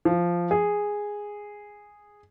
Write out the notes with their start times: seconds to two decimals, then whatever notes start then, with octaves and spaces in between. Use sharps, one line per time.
0.05 F3
0.51 G#4